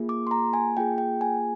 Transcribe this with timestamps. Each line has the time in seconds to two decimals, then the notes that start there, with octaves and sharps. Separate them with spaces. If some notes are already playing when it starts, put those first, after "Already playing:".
Already playing: A#3 F4 G#4
0.09 D6
0.27 C6
0.31 A#5
0.53 G#5
0.77 A#3 F4 G#4 G5
0.98 G5
1.21 G#5